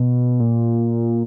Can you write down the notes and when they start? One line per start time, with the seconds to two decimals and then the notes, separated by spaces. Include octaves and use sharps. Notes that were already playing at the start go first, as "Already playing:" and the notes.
Already playing: B2
0.40 A#2